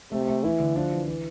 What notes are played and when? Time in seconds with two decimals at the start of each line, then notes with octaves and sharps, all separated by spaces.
0.12 C3 A3
0.28 A3
0.44 E3 E4
0.60 D3
0.76 F3 D4
0.92 E3
1.08 E3